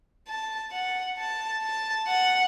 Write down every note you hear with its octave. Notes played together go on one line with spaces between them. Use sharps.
A5
F#5
A5
A5
F#5